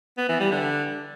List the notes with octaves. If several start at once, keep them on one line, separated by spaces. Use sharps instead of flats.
B3
E3
G3
D3